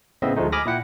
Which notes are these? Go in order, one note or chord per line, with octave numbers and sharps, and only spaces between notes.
A2 C#3 B3 C4 D#5 E5
D2 F3 G#3 A3 D#4
G#5 B5 D6 D#6 F6 A#6
A#2 E4 F#5 G5